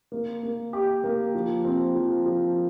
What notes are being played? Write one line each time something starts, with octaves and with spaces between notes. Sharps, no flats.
A#3
A#3
G4
A#3
F3
C4
F3
F3